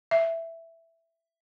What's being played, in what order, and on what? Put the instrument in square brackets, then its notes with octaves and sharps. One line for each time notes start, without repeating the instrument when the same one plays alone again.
[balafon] E5